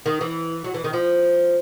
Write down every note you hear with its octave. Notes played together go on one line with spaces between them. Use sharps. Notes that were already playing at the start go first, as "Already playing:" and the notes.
D#3
E3
F#3
E3
D#3
F3